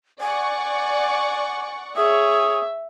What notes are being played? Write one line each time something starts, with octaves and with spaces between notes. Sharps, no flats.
D5 F#5 G#5 C#6
G#4 C#5 E5 D#6